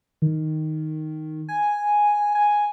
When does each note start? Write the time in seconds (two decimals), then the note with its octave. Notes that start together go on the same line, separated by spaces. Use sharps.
0.22 D#3
1.49 G#5
2.35 G#5